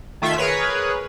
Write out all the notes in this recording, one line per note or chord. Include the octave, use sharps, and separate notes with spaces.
D#3 A3 F4 E5 G#6 B6
G#4 A#4 B4 C#5